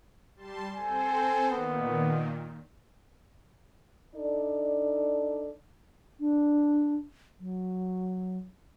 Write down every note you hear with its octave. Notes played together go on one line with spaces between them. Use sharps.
G3 A5 C6
C4 A4 C5 G#5
A#2 D#3 B3
D4 D#4 A4 D5
D4
F#3